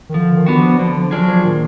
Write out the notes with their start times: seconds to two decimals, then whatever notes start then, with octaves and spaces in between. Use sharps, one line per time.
0.09 D#3
0.14 D3 F3
0.36 D#3
0.46 B3 D4 F#4
0.57 F3
0.79 D3 F3
0.95 F3
1.11 F3 F#3 D4 F4 G#4
1.28 F3
1.44 A#2 D#3